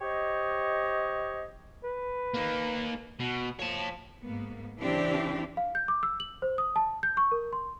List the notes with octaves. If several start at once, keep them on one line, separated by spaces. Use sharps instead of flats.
G4 C5 C#5 D#5
B4
A#3 D#4
B2
F3 C#5 A5
G#2 A#3 B3
C#3 E3 C4 D4 E4 G4
F5
G6
D6
E6
F#7
C5
D#6
A5
G6
C#6
A#4
C6